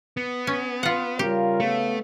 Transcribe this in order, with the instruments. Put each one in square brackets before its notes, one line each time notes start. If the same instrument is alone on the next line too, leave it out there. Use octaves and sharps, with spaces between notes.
[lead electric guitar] B3
[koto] C#4
F4 F#5
[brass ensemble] C#3 C#5 F5 [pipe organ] G3 F4 A#4 [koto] G4
[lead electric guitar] A3 [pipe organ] B3